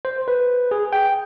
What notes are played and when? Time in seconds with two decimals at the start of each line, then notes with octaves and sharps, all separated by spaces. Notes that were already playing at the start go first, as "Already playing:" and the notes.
0.05 C5
0.28 B4
0.71 G#4
0.93 G5